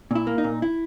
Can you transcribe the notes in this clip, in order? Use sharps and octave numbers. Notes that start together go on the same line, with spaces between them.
A#2 E4
A#3
D#4
A#2
E4